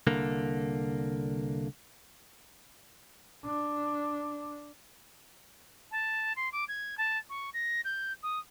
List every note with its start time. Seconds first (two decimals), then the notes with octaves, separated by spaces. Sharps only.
0.07 C2 D3 A#3
3.46 D4
5.91 A5
6.36 C6
6.52 D6
6.68 G#6
6.98 A5
7.30 C#6
7.54 A#6
7.85 G6
8.23 D#6